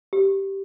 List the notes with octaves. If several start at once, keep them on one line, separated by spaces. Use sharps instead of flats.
G4